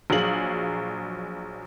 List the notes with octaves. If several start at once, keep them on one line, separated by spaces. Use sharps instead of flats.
A#1 F#3 G#4 F5 F#7